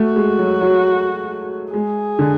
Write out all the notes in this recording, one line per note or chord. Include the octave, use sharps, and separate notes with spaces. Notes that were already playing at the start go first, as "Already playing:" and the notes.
Already playing: A3 F#4
G#3
F#3
F#3
G#3 G#4
D3